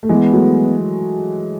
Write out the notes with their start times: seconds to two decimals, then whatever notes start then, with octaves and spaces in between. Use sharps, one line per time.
0.03 A3
0.09 E3 G#3 B3
0.32 F#3 A3